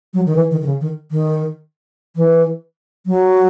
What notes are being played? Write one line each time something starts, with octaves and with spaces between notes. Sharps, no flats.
F#3
D#3
E3
D#3
D#3
C#3
D#3
D#3
E3
F#3